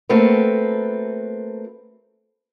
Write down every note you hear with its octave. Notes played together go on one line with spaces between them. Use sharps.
A3 A#3 C4 F#4 A4 B4